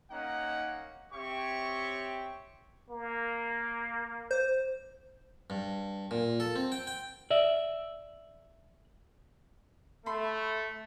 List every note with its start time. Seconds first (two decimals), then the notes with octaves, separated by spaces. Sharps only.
0.10 A#3 C#4 D#4 F#5
1.12 C4 G4 C#5 E5 C#6
2.90 A#3
4.31 C5
5.50 G2
6.11 A#2
6.40 A4
6.56 C4
6.72 G5
6.87 G5
7.31 D5 E5
10.06 A3 B5 C6